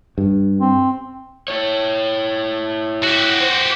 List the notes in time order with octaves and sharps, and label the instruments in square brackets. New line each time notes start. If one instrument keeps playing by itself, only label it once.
[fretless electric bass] G2
[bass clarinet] C4
[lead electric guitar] E4 C#5
[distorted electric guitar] F#4 G4
[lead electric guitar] C5